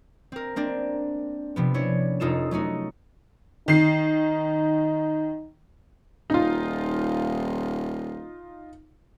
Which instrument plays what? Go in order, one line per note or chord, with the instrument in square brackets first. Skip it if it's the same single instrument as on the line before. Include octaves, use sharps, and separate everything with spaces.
[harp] C4 A#4
A#3 C4 D4
C3 F3 B3
C#4 D4 E4 C#5
F1 D#4 F4 A4 E7
F#3 A3 D#4 F#4
[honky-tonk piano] D#3 C7 [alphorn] D#4
[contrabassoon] D#1 [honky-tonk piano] D#4 F4